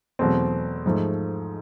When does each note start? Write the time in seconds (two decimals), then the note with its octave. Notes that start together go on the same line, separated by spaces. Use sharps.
0.19 E2 B2 F#3 A3 C4
0.86 G#2 F3 A3